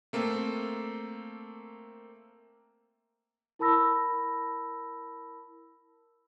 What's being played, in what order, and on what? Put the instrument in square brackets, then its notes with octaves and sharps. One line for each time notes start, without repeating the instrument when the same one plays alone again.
[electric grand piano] A3 A#3 C4 A4
[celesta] E4 A#4 A5 B5 E6 A#6